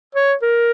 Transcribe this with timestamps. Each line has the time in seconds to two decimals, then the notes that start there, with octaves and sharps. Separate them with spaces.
0.15 C#5
0.42 A#4